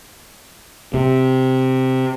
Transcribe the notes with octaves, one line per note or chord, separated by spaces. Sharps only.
C3